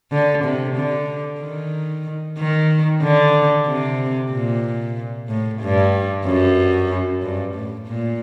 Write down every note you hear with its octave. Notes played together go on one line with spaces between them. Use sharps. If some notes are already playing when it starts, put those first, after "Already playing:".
D3
C3
D3
D#3
D#3
D3
C3
A#2
A2
G2
F#2
G2
A2
A#2